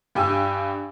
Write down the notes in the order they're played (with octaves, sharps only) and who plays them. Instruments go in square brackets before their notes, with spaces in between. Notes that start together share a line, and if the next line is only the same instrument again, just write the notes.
[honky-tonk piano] G2 G4 G#5 E6